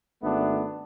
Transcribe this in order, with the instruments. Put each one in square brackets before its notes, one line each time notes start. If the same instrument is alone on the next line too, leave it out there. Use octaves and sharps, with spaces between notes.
[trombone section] G#1 A3 B3 D4